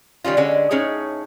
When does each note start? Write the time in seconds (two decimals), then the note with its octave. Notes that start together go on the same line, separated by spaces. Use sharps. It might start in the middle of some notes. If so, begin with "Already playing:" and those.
0.24 D#3 G3 C#4 F4
0.37 D3 G#3 C#4
0.71 A2 C#4 D#4 G#4 C#5